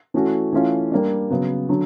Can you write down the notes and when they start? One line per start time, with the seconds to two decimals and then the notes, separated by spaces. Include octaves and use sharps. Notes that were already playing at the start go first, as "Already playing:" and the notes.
0.14 E3 A3 C#4 F#4
0.52 E3 A3 C#4 F4
0.92 G3 A#3 D4
1.30 C#3 F#3 B3
1.69 D3 F#3